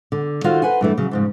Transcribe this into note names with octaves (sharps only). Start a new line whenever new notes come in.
D3
D#3 F4 F#4 A4 C5 F5
B4 C5 F#5 G#5
G2 E3 A3
C#3 F#3
F2 G#2 C#3